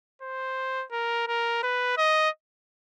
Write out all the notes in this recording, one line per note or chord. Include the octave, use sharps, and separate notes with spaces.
C5
A#4
A#4
B4
D#5